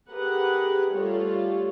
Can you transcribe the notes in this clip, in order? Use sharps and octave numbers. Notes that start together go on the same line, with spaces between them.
G4 G#4 A#4 B4 F#5
G3 A3 F4 A4 C#5